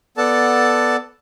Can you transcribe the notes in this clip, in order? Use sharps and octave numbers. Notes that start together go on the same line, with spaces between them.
B3 A4 D5 F#5 A5